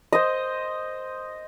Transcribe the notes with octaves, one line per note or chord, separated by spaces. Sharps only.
C5 D#5